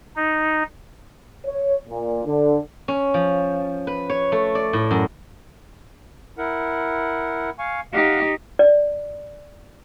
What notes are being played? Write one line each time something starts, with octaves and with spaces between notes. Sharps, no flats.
D#4
C#5
A#2
D3
C#4
F3
B4
C#5
A3
D5
A2
F#2
E4 A#4 F#5
F5 G#5 C#6
D#4 G4 F5 F#5
D5